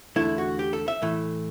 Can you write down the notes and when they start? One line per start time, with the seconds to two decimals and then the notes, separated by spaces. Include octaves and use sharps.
0.16 E2 D3 A3 E4
0.38 F#4
0.59 G4
0.73 A4
0.88 E5
1.02 A2 E3 A3